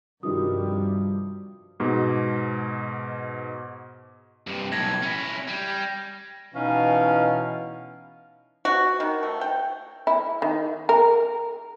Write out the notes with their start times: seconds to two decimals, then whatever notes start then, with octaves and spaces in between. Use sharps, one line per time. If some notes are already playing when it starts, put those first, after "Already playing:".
0.23 G2 C3 D#3 F3 G3 F#4 D#6
1.80 G#2 B2
4.47 G2 C3
4.72 B1 A2 G#6 A#6
5.03 C#4 E4
5.48 G3
6.54 B2 E3 C#4 D#4 F5
8.65 F#4
9.00 D#3
9.23 A3
9.41 G5
10.07 E4
10.42 D#3
10.89 A#4